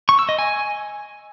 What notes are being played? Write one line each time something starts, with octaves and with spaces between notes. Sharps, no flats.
C#6
E6
D#5
G#5